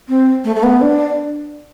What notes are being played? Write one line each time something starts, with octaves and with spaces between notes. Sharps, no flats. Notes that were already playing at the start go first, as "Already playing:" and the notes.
C4
A3
A3
B3
D4